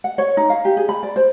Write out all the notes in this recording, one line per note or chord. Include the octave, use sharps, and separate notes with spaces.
F#5
C#5
D#4
F5
G4
G#4
B5
D5
C5